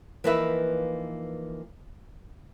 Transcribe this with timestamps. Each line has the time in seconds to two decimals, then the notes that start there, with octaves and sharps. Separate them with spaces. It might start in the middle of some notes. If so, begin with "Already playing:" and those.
0.24 E3 F3 A#3 D#4 B4 E5